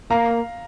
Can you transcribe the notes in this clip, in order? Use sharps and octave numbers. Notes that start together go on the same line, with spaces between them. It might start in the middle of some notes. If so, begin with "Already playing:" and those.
A#3 F5 A#5